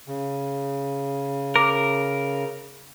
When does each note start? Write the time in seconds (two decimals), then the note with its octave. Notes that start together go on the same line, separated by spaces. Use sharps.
0.08 C#3
1.56 A#4 D6